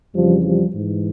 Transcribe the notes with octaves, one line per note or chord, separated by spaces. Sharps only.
F2 C#3 E3 F3 G3
F3 G3
G#2 E3